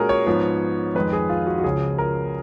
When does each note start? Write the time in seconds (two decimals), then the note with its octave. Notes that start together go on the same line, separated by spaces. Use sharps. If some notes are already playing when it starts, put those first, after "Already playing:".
Already playing: A#2 G#3 C#4 F#4 G#4 A#4
0.09 C#5
0.26 G#2 F3 B3
0.95 F2 D#3 G#3 B4
1.13 G#4
1.29 F4
1.47 F#4
1.58 F#4
1.64 C#2 C#3 F3 G#4
1.98 A#4